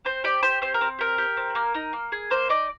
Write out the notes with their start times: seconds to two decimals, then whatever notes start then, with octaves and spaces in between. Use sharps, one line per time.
0.05 C4 C5
0.24 G4 D5
0.43 G4 C5
0.62 C4 C5
0.74 A#4
0.81 C4
0.99 G4 A#4
1.18 G4
1.37 C4
1.55 A#3
1.74 D#4
1.93 A#3
2.12 G#4
2.30 A#3 C5
2.49 D#4 D5